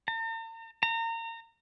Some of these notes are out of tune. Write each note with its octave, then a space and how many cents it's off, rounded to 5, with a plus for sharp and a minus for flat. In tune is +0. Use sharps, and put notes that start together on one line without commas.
A#5 -45
A#5 -30